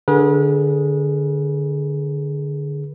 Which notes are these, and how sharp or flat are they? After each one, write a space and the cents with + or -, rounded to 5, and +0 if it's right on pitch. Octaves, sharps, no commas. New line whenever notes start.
D3 +0 G#4 +0 B4 -40